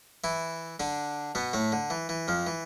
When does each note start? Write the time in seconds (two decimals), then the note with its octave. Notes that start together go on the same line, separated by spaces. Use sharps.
0.24 E3 E4
0.80 D3 D4
1.35 B2 B3
1.53 A2 A3
1.72 D3
1.90 E3
2.09 E3
2.28 F2 F3
2.47 E3